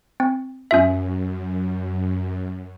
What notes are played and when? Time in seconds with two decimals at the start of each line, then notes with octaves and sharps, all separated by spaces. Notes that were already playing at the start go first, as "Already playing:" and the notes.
0.20 C4
0.71 F#2 C#4 F4 E5